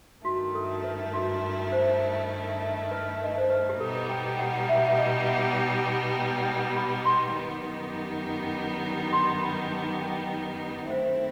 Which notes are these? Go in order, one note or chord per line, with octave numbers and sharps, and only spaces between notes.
G2 D#3 A3 E4 F#4
A4
B4
F#4
C5
B4
D#5
C5
B4
G4
B2 G3 B3 D#4 A4
G5
F#5
E5
F#5
E5
D#5
F#5
F#5
G5
A5
G5
A5
B5
C6
F#2 D#3 G3 B3 D#4
C6
B5
A5
G5
D#3 A3 C4 E4 C5